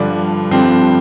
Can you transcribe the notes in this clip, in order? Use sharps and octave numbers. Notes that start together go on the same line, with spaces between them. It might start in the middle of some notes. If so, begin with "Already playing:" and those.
Already playing: G2 D3 F3 D4
G2 D3 F3 C4